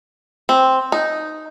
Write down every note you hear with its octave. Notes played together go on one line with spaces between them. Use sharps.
C4
D#4